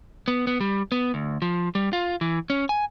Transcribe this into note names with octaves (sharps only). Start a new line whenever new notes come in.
B3
B3
G3
B3
D2
F3
G3
F4
E3
C#4
G#5